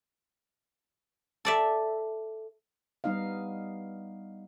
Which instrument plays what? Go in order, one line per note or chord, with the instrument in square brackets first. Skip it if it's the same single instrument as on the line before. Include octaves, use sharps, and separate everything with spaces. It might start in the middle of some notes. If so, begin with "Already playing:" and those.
[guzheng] A4 D5 E5
[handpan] G3 B3 D#4 D#5 F5